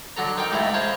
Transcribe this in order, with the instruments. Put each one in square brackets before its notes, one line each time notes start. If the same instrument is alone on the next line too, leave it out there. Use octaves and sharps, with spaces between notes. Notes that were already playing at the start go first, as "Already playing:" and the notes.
[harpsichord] D3 F#3 A4 A#5
D#4 A#4 G5 D6
C#2 G#2 G#3 A3 E4 A#5
C#4 C5 C#5 F5